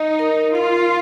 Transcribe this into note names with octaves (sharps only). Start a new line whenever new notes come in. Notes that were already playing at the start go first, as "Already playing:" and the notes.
Already playing: D#4 D#5
A#4
F4 F5